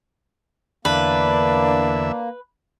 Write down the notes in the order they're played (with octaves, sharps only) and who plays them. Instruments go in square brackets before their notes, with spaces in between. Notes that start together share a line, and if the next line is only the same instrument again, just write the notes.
[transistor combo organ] E2 D3 E5 [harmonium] A#3 [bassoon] D4 [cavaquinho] B4